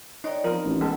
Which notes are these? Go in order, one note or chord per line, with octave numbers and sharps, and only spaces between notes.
D#4 C#5 D5 G5
F3 B3 C4 D#4 A#4
A1
G#3 B3 A4